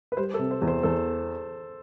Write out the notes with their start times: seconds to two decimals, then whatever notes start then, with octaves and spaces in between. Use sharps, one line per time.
0.12 B4
0.17 G3 C5
0.34 A4
0.39 C3
0.51 C5
0.62 E2
0.68 C5
0.83 E2 A4